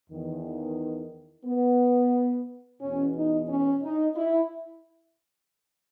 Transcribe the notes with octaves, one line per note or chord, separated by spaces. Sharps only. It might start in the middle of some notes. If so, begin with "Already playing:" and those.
E2 D#3
B3
E2 B2 C#4
D#4
C#4
D#4
E4